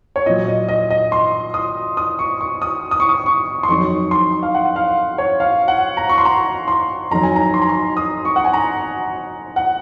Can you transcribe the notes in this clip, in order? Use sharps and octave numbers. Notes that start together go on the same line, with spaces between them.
C#5
A#2 F#3 D#5
D#5
D#5
D#5
C6
D#6
D#6
C#6
C#6
D#6
D#6
C#6
D#6
C#6
C6
F2 D#3 F#3 C#6
C6
F5
F#5
F5
C#5
F5
F#5
A#5
C#6
C6
A#5
C6
F2 D#3 F#3 A#5
G#5
A#5
C6
A#5
C6
D#6
C#6
F#5
G#5
A#5
F#5